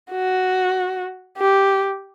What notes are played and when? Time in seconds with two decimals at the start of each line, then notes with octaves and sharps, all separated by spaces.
0.11 F#4
1.38 G4